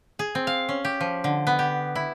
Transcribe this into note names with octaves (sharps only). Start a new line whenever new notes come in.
G#4
C4
F5
C#4
G4
F3
D3
B3
G4
E4